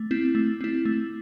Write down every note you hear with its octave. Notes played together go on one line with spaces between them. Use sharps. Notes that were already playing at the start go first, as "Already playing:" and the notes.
Already playing: A3
C4 E4
A3
C4 E4
A3